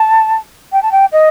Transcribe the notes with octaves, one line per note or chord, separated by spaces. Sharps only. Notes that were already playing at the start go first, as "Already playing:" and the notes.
Already playing: A5
G5
A5
G5
D#5